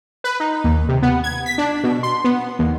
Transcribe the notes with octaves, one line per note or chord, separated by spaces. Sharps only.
B4
D#4
D#2
C3
B3
G#6
B6
D4
B2
C6
B3
D#2